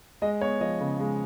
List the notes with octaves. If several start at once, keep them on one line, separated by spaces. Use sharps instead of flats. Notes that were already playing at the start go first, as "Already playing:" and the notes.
G#3 D#5
B3 C#5
F3 D#5
C#3
G#3